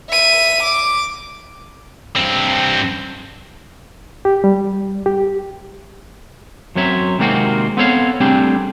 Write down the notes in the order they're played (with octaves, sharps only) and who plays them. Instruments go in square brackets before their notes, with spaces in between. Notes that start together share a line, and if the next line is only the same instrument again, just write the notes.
[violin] E5 D#7
D6
[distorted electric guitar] G2 C4
[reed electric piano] G4
G3
G4
[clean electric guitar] F#2 F#3 C4 C#5 E5
C3 D#3 G#3 A#3 C4 F#4
B3 C4 A4 C#5 D#5 F5
G3 A3 C4 D4 G4 G#4